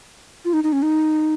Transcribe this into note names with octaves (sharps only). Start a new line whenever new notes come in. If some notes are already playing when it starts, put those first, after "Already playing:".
F4
D#4
D#4
C#4
D#4